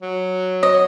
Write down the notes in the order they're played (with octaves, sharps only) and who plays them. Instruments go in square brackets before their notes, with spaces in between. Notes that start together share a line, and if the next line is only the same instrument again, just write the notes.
[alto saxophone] F#3
[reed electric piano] C#5 [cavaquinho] D#5